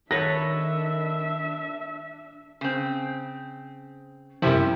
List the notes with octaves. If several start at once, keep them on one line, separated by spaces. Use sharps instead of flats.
D#3 D4 A4 B4 C#5 E5 A#6
C#3 C4
F#2 C3 F3 G3 C4 E4